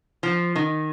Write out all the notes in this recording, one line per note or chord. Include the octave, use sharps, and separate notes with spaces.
F3
D#3